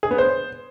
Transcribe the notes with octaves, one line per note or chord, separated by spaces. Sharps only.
G#4
B3
C5